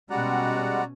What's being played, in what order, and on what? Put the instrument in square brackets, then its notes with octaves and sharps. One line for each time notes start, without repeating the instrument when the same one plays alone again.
[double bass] B2 C#4 [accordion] G3 G#3 F#5 [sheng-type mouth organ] F#4 D5 A#5